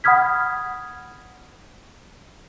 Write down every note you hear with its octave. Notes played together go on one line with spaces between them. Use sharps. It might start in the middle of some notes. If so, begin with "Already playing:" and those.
F#5 B5 D#6 F6 G#6 B6